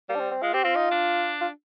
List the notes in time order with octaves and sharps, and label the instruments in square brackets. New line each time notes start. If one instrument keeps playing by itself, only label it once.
[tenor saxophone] G3 [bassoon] A#3
[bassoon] D4
C4
C4
[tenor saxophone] G#3 [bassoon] F4
[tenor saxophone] C4 [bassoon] G4
[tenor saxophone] C4 [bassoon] F4
[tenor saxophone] D#4
D4
[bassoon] F4